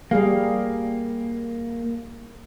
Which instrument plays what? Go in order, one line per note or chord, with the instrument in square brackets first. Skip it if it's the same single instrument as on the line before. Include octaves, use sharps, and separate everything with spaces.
[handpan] G3 G#4 F5 [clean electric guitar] A#3